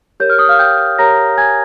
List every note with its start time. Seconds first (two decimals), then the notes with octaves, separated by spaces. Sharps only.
0.20 G4 A#4 C#5 G6
0.30 F6
0.39 D#6
0.48 F5 F6
0.59 G5 G6
0.98 G4 A#4 C#5 A#5 A#6
1.38 G#5 G#6